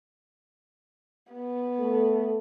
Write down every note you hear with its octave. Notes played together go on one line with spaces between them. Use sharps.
B3
A3 A4